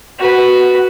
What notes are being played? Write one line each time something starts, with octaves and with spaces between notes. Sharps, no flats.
F#4 B4